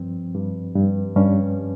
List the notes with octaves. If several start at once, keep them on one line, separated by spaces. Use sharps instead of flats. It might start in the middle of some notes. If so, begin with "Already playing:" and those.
Already playing: G2 F3 C4
G2
G2
G2 C#4